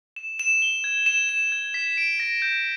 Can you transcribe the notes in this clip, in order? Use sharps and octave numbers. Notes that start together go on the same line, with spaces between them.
E7
E7
G7
G#6
E7
E7
G#6
B6
D7
A#6
G6